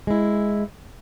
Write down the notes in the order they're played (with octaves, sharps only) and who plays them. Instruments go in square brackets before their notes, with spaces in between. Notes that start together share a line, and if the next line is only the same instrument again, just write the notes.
[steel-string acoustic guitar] G#3 E4